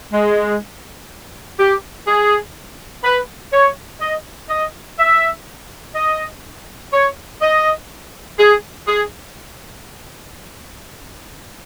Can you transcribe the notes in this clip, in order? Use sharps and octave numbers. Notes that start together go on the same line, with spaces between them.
G#3
G4
G#4
B4
C#5
D#5
D#5
E5
D#5
C#5
D#5
G#4
G#4